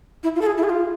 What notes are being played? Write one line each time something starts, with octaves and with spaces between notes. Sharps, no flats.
E4
F4
A4
G#4
E4
G#4
F4